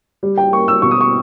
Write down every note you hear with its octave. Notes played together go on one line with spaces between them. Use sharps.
G3
G5
A#3 C#6
E6
B2 C#6
D#6
C#6